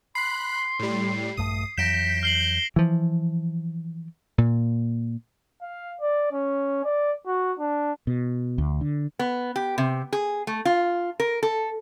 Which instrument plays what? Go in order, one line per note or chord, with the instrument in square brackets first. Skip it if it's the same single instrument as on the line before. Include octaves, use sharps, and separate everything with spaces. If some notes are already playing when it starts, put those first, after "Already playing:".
[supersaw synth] B5 F#6 [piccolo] C6 [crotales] C7
[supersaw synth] A2 G3
[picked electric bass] A#1 G2 A3 [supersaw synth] D#6
[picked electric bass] F2 E3 F#3 [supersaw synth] G6 [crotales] A#6 D7 E7 [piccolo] B6
[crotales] F6 C7 F#7 [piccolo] G7
[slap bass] E3 F3
A#2
[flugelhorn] F5
D5
C#4
D5
F#4
D4
[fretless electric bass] B2
D2
D3
[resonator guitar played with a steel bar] B3
G4
C3
G#4
A3
F4
A#4
A4